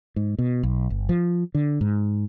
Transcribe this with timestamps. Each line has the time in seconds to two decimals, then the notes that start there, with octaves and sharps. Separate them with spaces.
0.16 G#2
0.39 B2
0.63 B1
0.90 G1
1.09 F3
1.55 D3
1.81 G#2